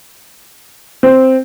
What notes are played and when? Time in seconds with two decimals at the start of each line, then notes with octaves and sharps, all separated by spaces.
1.03 C4